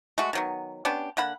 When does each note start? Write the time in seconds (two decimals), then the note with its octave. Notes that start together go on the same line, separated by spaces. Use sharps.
0.18 G#3 A3 F#4
0.33 D#3 F#3 B3
0.85 B3 C#4 D4 G4
1.17 D3 A#3 F#5 B5